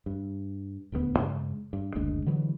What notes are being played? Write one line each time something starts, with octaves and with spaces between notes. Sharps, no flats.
G2
D#1 D2 G3 B3
G2 C#3 G#3
G2
F#1 D2 G#3 D4
D3 E3 F#3 G#3